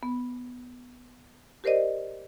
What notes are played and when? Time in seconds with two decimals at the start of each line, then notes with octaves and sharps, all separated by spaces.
0.03 B3
1.64 G4 A#4 C5 D5 D#5